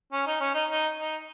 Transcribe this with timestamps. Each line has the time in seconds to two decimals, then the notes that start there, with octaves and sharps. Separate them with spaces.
0.12 C#4
0.26 D#4
0.41 C#4
0.54 D#4
0.69 D#4
0.98 D#4